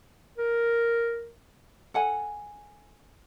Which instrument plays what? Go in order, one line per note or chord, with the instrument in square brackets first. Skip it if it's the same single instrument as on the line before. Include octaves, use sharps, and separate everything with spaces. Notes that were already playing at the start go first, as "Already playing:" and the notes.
[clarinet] A#4
[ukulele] A4 F#5 G#5